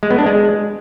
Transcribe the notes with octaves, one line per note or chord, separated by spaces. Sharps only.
G#3
B3
D4
G#3